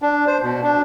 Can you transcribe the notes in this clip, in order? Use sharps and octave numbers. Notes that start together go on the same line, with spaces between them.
D4
C5
B2
D4